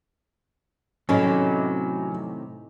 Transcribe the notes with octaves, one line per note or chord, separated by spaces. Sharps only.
A2 C3 D#3 F#3 C#4